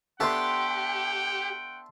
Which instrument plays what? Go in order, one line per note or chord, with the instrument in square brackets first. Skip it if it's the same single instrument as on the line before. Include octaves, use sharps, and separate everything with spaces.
[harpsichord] A3 B3 D4 [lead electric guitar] G4 [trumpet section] F#5 G5 [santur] A5 C6